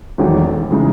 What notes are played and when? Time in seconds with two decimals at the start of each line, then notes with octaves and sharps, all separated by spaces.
0.18 E1 E2 D#3 F#3 A3
0.71 C#3 E3 G#3 D#4